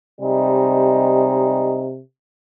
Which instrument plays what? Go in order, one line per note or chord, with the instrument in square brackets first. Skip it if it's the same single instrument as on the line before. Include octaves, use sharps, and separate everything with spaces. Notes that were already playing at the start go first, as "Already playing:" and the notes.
[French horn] C3 [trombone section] G3 G#3 D#4